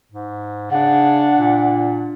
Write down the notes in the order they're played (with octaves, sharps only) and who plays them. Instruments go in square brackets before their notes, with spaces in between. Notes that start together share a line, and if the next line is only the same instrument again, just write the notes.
[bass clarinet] G#2
[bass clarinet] C#3 [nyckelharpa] D4 [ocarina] F#5
[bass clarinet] A#2